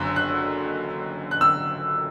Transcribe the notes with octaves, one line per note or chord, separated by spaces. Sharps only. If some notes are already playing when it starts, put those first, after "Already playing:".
Already playing: F#1 F#2 D3 E6
F#6
F#6
E6